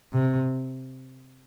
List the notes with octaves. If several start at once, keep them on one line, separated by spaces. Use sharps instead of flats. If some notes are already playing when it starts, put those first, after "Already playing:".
C3